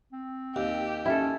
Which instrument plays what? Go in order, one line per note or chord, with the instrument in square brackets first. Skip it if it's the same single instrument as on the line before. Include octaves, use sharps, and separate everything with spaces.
[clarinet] C4
[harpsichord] D#2 [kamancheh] G4
[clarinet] C#4 [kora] E4 A4